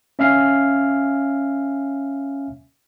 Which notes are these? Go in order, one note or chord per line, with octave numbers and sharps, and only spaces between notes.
C#4 E5 F5 G#5 F6 C7